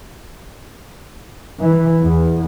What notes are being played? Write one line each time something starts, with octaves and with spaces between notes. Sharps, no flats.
E3
E2